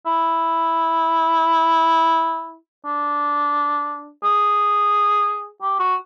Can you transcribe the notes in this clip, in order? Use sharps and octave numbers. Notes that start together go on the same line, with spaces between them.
E4
D4
G#4
G4
F#4